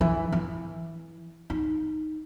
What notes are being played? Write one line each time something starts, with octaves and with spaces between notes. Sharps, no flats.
E3
E3
D#4